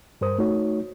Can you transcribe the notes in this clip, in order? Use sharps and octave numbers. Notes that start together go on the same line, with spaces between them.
G2 A#4 C5 D#6
A3 D#4 F#4 C#5